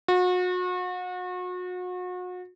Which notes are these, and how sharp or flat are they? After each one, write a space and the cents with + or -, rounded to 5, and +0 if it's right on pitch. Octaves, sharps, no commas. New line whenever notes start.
F#4 -35